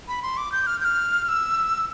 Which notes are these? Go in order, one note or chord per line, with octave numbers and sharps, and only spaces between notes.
B5
C6
D6
G6
F6
G6
F6
F6
E6